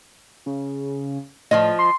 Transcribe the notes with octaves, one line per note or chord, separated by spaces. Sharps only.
C#3
A2 F3 F4 D#5
C6